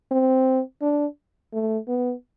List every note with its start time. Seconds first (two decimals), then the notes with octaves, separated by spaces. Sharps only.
0.11 C4
0.82 D4
1.53 A3
1.88 B3